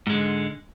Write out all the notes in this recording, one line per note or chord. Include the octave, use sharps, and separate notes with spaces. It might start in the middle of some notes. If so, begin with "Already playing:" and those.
G#2 D3 G#3